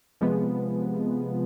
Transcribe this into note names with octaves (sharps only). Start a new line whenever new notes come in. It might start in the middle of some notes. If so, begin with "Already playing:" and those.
C3 F3 G#3 B3